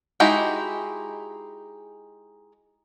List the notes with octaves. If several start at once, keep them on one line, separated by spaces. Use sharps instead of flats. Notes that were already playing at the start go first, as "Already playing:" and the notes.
G#3 D#4 E4 F#4 G4